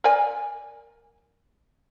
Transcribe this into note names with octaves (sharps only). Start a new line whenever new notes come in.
A#4 D5 G#5